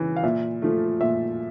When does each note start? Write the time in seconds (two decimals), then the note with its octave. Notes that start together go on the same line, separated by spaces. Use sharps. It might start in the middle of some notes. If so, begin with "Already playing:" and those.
Already playing: C#3 E3
0.16 F5
0.23 A#2 E5
0.62 F3 A3
1.01 A#2 E5